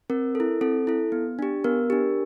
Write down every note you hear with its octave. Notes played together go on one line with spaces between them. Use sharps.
C4 A#4
E4 A4
C4 A4
E4 A4
B3
D4 G4
B3 A#4
D4 G4